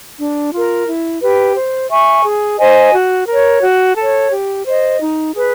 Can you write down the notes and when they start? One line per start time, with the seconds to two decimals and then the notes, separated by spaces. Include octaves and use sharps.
0.18 D4
0.52 F4 A#4
0.86 E4
1.21 G4 B4
1.55 C5
1.90 E5 G#5 C#6
2.24 G#4
2.58 C5 D#5 G#5
2.93 F#4
3.27 A#4 C#5
3.62 F#4
3.97 A4 C#5
4.31 G4
4.66 C5 D#5
5.00 D#4
5.34 G#4 B4